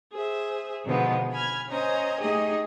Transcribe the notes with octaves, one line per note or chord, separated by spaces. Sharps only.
G#4 C5 E5
B2 D3 D#3 F3 G#3 B3
G#5 B5 F6 G#6
C#4 C5 D#5 G#5 A#5
A3 D#4 G4 G#4 D#5 G#5